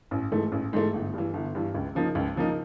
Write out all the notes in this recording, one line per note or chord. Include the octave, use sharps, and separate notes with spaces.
A1
G#2 E3 A3
A1
G#2 E3 A3
G1
G2 E3
G1
G2 E3
C#2
C#3 F3 A#3 D#4
C#2
C#3 F3 A#3 D#4